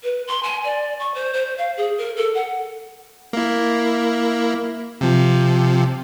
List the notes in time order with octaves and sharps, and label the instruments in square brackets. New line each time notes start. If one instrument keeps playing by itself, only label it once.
[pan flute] B4
C6
G#5
D5
C#6
C5
C5
F5
G#4
A#4
A4
F#5
[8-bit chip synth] A#3 E4
C3 F3